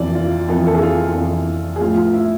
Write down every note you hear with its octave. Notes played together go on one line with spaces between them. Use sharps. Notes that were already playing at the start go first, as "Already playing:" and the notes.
Already playing: F2 E3 D5
F4
F2 E3 F4
A4
G#4
F4
F2 E3
G#4
A2 F3 F4
F4
E4